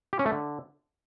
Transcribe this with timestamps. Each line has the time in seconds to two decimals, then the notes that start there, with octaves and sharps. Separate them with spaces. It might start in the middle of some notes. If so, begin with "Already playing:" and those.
0.13 G4
0.19 C#4
0.26 A3
0.32 D3